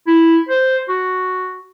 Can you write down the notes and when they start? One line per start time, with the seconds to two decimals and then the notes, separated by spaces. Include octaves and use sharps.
0.07 E4
0.49 C5
0.89 F#4